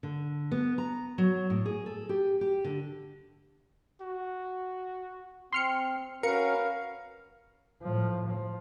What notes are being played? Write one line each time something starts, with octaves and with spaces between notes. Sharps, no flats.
D3
B3
A#5
F#3
A2
G#4
A4
G4
G4
D3
F#4
C4 C6 F6 C#7
C#4 F#4 A#4 B4 F5 C#7
A2 F3
F3